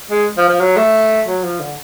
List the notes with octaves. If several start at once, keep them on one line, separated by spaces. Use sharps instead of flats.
G#3
F3
F3
F#3
A3
F#3
F3
D3